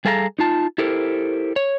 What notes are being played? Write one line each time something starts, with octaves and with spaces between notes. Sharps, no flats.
G3 G#4 A4 F5 G5 A#5
D#4 F4 A5
E4 G4 A4 A#4 C5
C#5